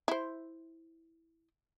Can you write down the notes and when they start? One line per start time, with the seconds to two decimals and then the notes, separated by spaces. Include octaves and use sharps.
0.08 E4 C5